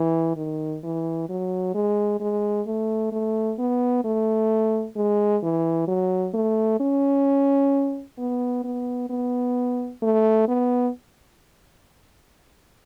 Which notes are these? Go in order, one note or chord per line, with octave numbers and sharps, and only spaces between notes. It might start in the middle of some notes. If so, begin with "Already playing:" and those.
Already playing: E3
D#3
E3
F#3
G#3
G#3
A3
A3
B3
A3
G#3
E3
F#3
A3
C#4
B3
B3
B3
A3
B3